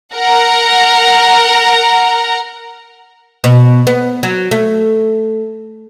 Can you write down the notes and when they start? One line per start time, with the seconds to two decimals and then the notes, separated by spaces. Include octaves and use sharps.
0.14 A#4 F#5 A#5
3.44 B2
3.87 B3
4.23 F#3
4.51 A3